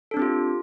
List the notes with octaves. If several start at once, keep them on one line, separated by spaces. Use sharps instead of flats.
C4 D4 F4 G4 A4